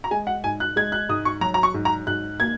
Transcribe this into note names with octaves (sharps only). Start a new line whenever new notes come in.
A#5
G#3 G#5
F#5
G#2 G#5
F#6
G#3 G#6
F#6
G#2 D#6
C#6
F#3 A#5
A#5
C#6
G#2
A#5
G#2 F#6
A#3 G#6